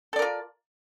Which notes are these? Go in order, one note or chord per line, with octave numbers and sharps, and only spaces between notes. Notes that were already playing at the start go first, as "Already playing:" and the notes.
F4 A4 A#4 D5